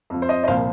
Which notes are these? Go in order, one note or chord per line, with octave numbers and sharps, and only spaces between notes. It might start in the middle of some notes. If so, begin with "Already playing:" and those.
F2 F3
C5
D#5
D#5
C2 A#2 F3 C5 F5